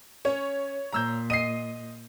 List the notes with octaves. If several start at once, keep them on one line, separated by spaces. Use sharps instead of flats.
C#4 C#5
A#2 A#5 E6 G6
D#5 C7 D#7